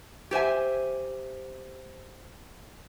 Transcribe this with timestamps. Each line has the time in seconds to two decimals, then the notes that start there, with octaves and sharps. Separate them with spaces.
0.31 G4 C5 E5 G#5